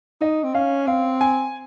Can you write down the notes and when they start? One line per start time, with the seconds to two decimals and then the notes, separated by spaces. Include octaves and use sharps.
0.21 D#4 D#5
0.43 C4
0.54 C#4 F5
0.87 C4 F5
1.21 G#5